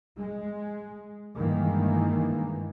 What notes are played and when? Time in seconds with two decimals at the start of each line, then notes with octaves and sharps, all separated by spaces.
0.17 G#3
1.38 G2 D#3 E3 G#3 A#3